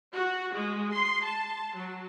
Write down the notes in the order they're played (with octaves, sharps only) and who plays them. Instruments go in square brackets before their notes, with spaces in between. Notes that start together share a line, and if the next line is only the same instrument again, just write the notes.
[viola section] F#4
G#3
C6
A5
F#3